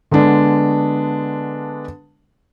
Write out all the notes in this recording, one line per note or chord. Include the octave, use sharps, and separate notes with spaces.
D3 G#3 B3 D4